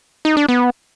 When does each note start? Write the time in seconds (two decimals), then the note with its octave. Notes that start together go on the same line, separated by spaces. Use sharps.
0.25 D#4
0.37 D4
0.49 B3